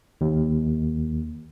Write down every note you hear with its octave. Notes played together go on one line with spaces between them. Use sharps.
D#2